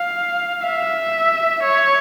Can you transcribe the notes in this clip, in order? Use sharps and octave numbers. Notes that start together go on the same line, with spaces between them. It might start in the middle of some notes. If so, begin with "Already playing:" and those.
Already playing: F5
E5
C#5